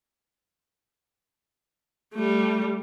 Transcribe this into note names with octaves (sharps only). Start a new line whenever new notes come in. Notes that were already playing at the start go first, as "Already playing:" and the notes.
G3 A3